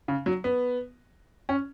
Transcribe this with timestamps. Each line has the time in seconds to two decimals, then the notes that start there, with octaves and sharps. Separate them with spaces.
0.08 C#3
0.26 F#3
0.44 B3
1.49 C#4